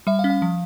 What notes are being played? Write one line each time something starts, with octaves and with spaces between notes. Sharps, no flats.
G3 E5
F5
C#4
F5
F3